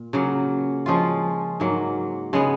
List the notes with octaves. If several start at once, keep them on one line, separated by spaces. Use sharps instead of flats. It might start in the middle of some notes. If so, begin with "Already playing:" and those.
Already playing: A#2
C#3 F#3 A#3
F3 G#3 C#4 F4
G#2 F#3 A#3
C#3 G#3 B3